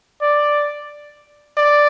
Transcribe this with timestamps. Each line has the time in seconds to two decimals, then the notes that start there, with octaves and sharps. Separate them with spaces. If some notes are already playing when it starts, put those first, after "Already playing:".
0.22 D5
1.57 D5